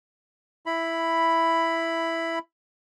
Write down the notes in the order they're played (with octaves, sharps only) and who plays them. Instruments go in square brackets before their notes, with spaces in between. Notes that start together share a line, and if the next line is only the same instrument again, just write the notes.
[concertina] E4 B5